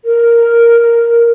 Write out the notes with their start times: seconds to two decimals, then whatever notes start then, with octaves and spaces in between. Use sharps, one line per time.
0.05 A#4